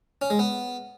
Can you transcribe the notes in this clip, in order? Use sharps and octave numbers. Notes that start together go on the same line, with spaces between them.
C#4
G#3
B3